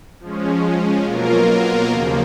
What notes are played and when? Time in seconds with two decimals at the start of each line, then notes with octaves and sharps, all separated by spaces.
0.20 F3 G#3 C#4
1.04 B2 F#3 A#3 F4 A#4
1.88 D#2 C#3 F3 A#3